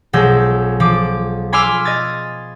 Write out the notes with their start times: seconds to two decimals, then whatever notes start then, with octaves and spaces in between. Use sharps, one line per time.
0.13 B1 F3 F#3 G#3 E6 G6
0.80 F3 D6
1.53 G#5 B5 C6 D6 E6 F6
1.85 D#5 G#6 A6